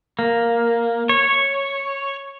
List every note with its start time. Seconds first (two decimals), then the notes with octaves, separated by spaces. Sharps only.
0.19 A#3
1.09 C#5